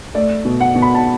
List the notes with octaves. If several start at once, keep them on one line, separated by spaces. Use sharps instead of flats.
A3 D5
B2
F#5
B2
B5
A5